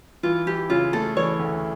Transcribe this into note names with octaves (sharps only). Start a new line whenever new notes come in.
E3 F4
E3 G4
C#3 F4
A3 A4
E3 C#5
D2